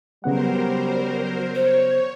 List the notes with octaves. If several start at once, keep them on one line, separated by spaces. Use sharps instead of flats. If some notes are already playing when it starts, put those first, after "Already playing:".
C#3 F#3 G3 B3 A#4 C5 F#5
C5 C#5